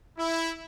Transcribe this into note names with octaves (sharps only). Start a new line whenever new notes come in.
E4